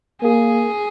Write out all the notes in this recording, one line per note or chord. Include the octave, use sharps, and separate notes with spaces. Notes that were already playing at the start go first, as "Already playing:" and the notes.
A#3 G#4